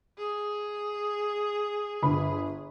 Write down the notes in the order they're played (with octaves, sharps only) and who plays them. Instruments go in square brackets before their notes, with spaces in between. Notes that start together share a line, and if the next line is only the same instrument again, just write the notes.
[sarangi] G#4
[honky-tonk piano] G1 B5